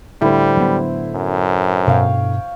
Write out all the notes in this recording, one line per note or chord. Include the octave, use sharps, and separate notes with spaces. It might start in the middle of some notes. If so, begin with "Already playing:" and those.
A2 D3 G3 E4 C5
F#3 B3
F#2
G2 B2 C#5 F5 G5